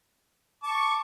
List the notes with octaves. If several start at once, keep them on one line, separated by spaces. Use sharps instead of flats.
A5 C#6 D6